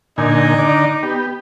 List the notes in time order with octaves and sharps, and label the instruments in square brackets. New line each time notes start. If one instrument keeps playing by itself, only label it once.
[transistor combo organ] A#2 D3 G#5 [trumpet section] D#4
[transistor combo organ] D3 D5
B3 G4